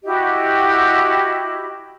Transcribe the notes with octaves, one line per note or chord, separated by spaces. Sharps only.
E4 F#4 G4 D#5